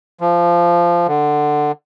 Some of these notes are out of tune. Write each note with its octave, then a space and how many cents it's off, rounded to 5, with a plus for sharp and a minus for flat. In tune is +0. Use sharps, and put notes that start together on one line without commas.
F3 -15
D3 +15